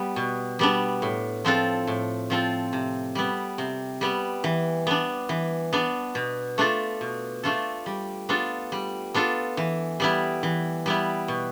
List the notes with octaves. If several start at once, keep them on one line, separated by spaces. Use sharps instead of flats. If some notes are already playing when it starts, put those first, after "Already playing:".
Already playing: G3 B3
B2
G3 B3 D4
A2
F3 C4 F4 A4
A2
F3 C4 F4 A4
C3
G3 B3
C3
G3 B3
E3
B3 D4
E3
B3 D4
B2
A3 D4 F4 A4
B2
A3 D4 F4 A4
G3
B3 D4 F4 A4
G3
B3 D4 F4 A4
E3
G3 B3 E4
E3
G3 B3 E4
B2